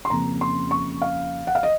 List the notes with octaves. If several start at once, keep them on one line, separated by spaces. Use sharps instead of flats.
C6
F2 C#3 F3 A#3 C#4 A#5
C6
C#6
F5
F#5
F5
D#5